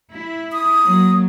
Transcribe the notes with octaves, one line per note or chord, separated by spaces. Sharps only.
E4
D#6
F#3 A#3